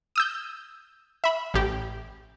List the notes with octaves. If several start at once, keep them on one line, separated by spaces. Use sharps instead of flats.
D#6 E6 G6
E5 B5
A1 G4